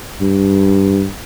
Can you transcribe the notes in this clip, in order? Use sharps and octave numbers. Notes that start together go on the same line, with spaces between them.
G2